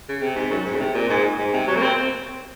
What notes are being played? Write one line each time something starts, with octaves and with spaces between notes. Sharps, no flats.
C#3
C3
G#2
F#2
G#2
C#3
C3
A#2
G#2
G#2
C3
F#3
A#3
C4